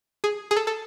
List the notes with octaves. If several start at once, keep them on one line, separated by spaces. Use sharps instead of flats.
G#4
G#4
A4
A4